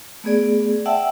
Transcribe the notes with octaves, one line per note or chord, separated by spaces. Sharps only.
A3 B3 G#4 D5
D5 E5 F#5 G5 A5 E6